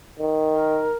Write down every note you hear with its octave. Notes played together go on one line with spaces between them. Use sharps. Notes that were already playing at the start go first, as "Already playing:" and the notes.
D#3
A#4